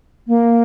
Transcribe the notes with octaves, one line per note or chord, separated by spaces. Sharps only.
A#3